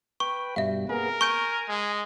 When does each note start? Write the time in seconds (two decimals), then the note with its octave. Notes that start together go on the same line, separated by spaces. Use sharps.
0.20 B4 G5 C#6
0.56 G2 B2 G3 E5 F5
0.89 A#3 B3 G#4 A#4
1.21 G#5 C#6 G6 D7
1.68 G#3